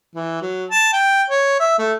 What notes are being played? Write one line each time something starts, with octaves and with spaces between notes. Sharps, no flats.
E3
F#3
A5
G5
C#5
E5
A3